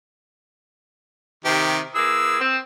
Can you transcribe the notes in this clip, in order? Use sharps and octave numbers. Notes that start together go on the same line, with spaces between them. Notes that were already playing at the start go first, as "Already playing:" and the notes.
C3 D#3 G4
E3 A#3 G#4 E6
C4